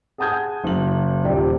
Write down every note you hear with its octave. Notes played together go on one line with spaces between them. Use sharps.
G#4 F#5 A5 D#6 G6 G#6
F#1 F#7
D#1 A#2 G4 D5